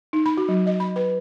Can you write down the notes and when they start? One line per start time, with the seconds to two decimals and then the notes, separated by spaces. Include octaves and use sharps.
0.13 D#4
0.26 B5
0.37 F#4
0.49 F#3
0.67 D#5
0.80 B5
0.96 B4